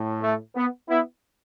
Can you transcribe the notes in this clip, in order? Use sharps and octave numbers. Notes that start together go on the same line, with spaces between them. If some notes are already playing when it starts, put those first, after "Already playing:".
Already playing: A2
A3
B3
B3 E4